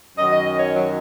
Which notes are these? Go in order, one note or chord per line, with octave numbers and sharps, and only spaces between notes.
F#2 D#3 F#3 D#5
D#5
D#5
C#5
F#3